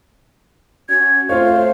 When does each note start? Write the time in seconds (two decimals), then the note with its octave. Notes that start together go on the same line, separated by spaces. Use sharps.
0.89 C#4 F#4 G#6
1.29 A3 C4 F4 C5 C#5 F5